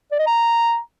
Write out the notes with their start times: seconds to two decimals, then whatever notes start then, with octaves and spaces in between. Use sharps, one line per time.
0.12 D5
0.19 D#5
0.27 A#5